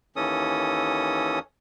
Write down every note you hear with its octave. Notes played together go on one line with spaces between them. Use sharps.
D#2 E3 C#4 A4 D#6